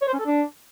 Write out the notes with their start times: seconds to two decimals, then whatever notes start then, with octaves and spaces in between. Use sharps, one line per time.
0.02 C#5
0.08 C5
0.14 C#4
0.19 A4
0.25 D4